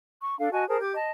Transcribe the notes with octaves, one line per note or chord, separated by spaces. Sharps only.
C#6
D4 A4 F5
F#4 D#5 G#5 A5
G#4 A#4 C5 A5
G4 D6 G#6
D#5 A5